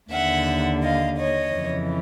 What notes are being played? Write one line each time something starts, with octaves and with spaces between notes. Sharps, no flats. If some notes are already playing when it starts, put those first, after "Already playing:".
D#2 D3 E5 F#5
D#5 F5
C#5 D#5
F2 C#3 E3